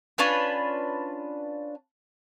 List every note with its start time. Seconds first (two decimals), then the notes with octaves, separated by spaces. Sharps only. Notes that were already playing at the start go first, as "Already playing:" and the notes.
0.18 C#4 D4 F4 B4